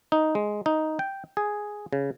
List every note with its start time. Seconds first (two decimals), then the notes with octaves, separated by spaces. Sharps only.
0.12 D#4
0.35 G#3
0.66 D#4
0.99 G5
1.37 G#4
1.93 C#3